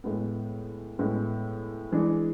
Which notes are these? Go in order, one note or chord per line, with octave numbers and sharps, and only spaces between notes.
A2 G#3 B3
A2 G#3 B3
E3 G#3 D4 G#4